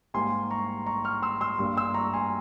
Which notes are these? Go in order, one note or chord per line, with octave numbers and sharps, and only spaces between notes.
G#2 G3 A#3 G#5 C6
A#5 C#6
A#5 C#6
C#6 F6
C6 E6
C6 E6
G2 G3 A#3
C6 E6
A#5 C#6
G#5 C6